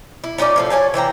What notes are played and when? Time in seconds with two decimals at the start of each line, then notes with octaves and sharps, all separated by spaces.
0.24 E4
0.38 C#4 D#4 F4 D5
0.56 A2 F3 F5
0.70 C#5 D#5 G#5 A5
0.94 E3 C5 G5 A#5